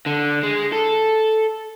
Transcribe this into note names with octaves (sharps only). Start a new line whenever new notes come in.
D3
G#3
A4